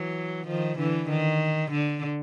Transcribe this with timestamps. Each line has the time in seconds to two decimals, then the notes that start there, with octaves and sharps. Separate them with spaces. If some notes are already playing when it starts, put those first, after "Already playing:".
Already playing: E3 F#3
0.47 D#3 F3
0.78 D3 E3
1.10 D#3
1.71 D3